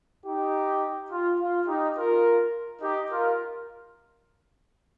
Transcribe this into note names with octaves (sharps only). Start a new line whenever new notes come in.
D#4 G4
F4
F4
D#4 G4
F4 A#4
D#4 G4
F4 A#4